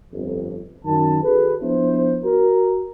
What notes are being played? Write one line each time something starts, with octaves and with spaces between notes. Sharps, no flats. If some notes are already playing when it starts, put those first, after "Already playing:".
G1 F2
F#2 D#3 A5
F#4 G#4 A4 B4
F3 B3 D4 E4 C5
F#4 A#4